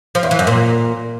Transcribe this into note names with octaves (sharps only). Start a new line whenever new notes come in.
F3
E2
E3
F#2
A#2